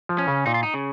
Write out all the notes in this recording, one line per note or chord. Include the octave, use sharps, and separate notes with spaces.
F3
C#4
C#3
A#2 D#4
F4
D#4
C#3